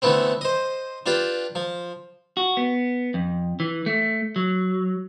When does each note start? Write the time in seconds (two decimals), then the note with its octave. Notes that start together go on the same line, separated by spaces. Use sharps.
0.02 D3 E3 A3 B3 C4
0.41 C5 D#5
1.06 D4 F4 G4 B4
1.55 F3
2.37 F#4
2.57 B3
3.14 F2
3.60 E3
3.86 A3
4.36 F#3